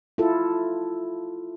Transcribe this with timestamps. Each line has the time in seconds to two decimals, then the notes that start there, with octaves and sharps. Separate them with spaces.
0.18 E4 F4 A4